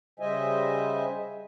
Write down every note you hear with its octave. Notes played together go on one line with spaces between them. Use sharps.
C#3 G3 C5 D#5 E5 G#5